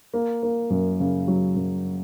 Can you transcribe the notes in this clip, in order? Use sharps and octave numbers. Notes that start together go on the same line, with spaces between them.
A#3
A#3
F#2
C#3
F#3
F#2